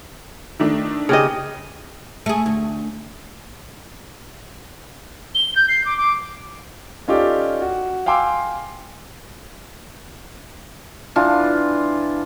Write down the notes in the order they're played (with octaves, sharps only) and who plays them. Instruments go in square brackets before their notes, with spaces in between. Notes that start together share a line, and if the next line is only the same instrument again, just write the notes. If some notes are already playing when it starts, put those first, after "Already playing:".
[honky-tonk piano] D#3 A3 D4
[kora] C#3 G4 D#5
[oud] A3 G#4
D2
[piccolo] G7
G6
C7
D6
D6
[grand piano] C#4 D#4 F4 G4 A4 D5
F#4
F5 G5 G#5 C6 D6 E6
[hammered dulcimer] E3 D4 F4